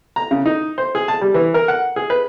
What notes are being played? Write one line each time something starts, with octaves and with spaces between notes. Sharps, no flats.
A#5
C#3
D#4
C5
G#4
A5
G3
E3
A#4
F#5
G#4
B4